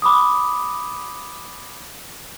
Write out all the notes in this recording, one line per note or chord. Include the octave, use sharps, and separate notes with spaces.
B5 D6 D#6